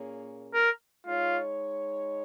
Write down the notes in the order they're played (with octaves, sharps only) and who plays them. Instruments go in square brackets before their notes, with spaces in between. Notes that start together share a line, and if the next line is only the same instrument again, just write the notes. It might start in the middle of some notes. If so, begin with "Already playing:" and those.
Already playing: [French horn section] A#2 A#3 C#4 G#4 C#5
[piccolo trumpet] A#4
[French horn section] G#3 D#4 C#5 [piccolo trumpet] F4